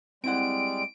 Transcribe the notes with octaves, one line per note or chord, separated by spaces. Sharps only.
G3 G#3 C4 E4 F#5 D7